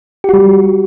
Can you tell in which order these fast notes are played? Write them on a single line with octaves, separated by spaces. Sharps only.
G4 F#4 G3